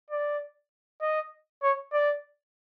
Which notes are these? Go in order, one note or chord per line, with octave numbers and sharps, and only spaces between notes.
D5
D#5
C#5
D5